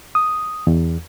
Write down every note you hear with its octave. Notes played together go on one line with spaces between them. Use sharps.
D#6
E2